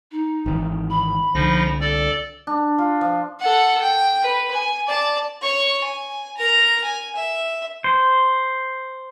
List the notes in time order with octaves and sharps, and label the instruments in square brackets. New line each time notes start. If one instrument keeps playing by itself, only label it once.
[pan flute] D#4
[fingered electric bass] G#1 D#3 E3
[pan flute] B5
[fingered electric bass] C2 D3 [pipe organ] F3 D#4 A#6
[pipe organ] A4 D5
[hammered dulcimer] D4
F4
F3
[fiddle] A4 F#5
G5
B4
G#5
D5 A5
[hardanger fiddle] C#5 C#6
G#5
A#4 A#5
G#5
E5
[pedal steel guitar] C5